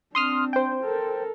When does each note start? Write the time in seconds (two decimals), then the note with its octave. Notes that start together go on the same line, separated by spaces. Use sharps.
0.15 C4 D4 C6 D#6 F6
0.53 C5 G5
0.83 A4 A#4